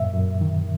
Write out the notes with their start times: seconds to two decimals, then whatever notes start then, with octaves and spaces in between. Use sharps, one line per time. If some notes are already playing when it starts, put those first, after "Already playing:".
Already playing: F#2 A#2 E5
0.14 F#2
0.41 D#3